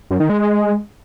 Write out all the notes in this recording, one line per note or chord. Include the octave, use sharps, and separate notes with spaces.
F#2
D#3
G#3